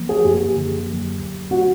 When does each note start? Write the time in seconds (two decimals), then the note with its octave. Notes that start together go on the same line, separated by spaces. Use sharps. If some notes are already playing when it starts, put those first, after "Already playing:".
Already playing: F3 A#3
0.09 G#4
0.24 F#2 G4
0.56 D3
0.87 F#3
1.19 D2
1.51 F#4